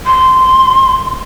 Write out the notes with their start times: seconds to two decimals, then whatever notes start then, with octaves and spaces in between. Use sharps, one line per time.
0.06 C6